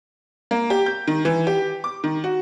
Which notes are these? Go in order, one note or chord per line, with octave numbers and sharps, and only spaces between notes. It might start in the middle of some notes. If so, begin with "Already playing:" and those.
A#3
G4
G6
D#3
E3
G4
D6
D#3
F#4